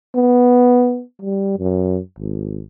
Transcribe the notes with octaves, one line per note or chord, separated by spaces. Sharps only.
B3
G3
F#2
G#1